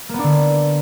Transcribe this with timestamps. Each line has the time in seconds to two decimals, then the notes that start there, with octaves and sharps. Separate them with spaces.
0.09 A#3
0.14 B3
0.19 D4
0.24 D3